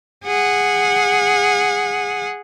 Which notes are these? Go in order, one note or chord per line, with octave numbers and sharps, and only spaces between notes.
G#4 F#5